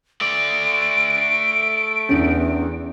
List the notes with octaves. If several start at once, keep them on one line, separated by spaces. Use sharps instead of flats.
A3 D5 D7
E2 C#4 D4 E4